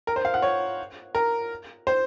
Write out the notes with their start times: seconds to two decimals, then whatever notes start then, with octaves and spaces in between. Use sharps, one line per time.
0.07 A#4
0.16 C5
0.25 F5
0.34 F#5
0.42 C#5
1.15 A#4
1.87 C5